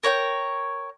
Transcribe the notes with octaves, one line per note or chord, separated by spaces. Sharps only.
A#4 C#5 F#5 G5